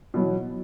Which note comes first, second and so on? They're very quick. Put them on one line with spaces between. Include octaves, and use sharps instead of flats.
B2 F#3 E3